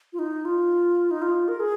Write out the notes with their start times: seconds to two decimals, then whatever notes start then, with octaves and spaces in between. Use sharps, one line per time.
0.13 F4
0.19 D#4
0.45 F4
1.11 D#4
1.22 F4
1.48 A#4
1.60 G#4